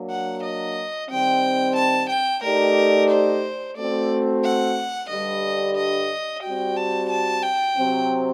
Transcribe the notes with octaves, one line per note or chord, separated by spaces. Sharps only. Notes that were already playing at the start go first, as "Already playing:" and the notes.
Already playing: F#3 A#3 D4
F#5
D#5
D#3 G3 C4 G5
A5
G5
A3 D#4 G4 A#4 D5
C5
A3 C4 F#4 D5
F#5
G2 D3 G3 D#5
D#5
G3 C4 F#4 G5
A5
A5
G5
C3 F#3 C4